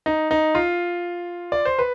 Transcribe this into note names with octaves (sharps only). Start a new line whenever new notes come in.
D#4
D#4
F4
D5
C5
B4